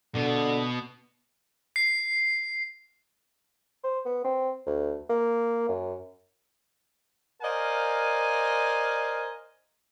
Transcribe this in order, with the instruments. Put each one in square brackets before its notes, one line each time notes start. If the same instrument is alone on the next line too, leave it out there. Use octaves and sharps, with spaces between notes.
[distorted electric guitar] B2 [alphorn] D3
[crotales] C7
[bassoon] C5
B3
C4
D2
A#3
F#2
[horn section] A#4 C5 D5 D#5 F5 G#5